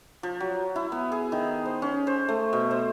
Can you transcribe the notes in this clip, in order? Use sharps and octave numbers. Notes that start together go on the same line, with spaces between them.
F3
F#3
E4
B3
G#4
D#3
C5
C#4
C5
A3
B2
C5